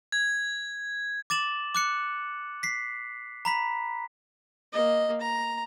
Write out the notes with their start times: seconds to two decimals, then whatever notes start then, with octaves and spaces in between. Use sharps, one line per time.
0.12 G#6
1.30 D6 A6 E7 F#7
1.75 D6 F#6 C#7
2.63 B6 C7
3.45 A#5 B5 B6
4.73 A#3 D#5
5.21 A#5